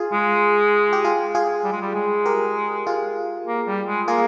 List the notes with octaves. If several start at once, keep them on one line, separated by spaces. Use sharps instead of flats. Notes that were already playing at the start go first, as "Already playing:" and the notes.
Already playing: F4 G#4
G#3
G4
F4 G#4
F4 G#4
G3
G#3
G3
G#3
G4 A#4
F4 G#4
A#3
G3
G#3
A#3 F4 G#4